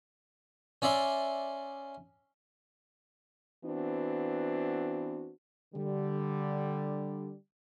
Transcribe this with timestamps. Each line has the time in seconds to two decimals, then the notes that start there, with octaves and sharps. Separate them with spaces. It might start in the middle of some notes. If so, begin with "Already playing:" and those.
0.82 C#4 D5 E5 C6
3.64 E3 B3 C4 D4 F#4
5.74 D3 G3